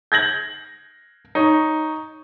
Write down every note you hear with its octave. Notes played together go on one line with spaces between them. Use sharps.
G6 G#6 A#6 F#7
D#4 C#5